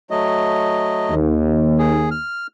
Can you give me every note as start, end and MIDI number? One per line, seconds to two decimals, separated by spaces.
0.11 1.15 54
0.11 1.15 57
0.11 1.15 75
1.10 2.15 39
1.78 2.10 68
2.11 2.47 89